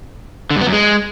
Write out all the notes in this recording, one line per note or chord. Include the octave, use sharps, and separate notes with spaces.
D3
G2
B3
F#2
G#3